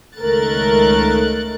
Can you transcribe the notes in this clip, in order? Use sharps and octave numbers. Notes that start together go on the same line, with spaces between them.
C#2 D#3 A3 A#4 F#6 A6